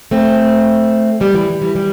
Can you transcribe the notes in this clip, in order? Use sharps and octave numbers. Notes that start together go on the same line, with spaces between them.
A3 C4
G3 B3
E3
E3 G3
E3 G3